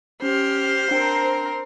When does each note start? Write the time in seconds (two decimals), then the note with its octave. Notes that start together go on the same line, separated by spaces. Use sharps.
0.22 C#4 G4 C5 F6
0.91 C4 D4 A#4 G5 D7